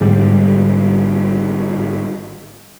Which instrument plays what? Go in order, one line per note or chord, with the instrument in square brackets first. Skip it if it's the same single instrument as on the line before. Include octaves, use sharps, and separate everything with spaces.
[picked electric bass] G#1 D3 G3 [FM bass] G#2